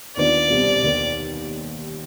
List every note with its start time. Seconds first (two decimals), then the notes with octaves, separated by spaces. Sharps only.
0.17 D#2 D#3 B3 D4 F4 D5
0.50 C2 B2 G3 C4
0.83 D#2 D#3 B3